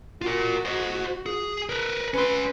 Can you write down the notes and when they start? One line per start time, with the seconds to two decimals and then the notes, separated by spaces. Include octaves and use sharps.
0.22 F4 F#4 A#4
0.65 C5 D#5
1.26 G#4
1.69 A#4 B4
2.14 C#4 B4 C6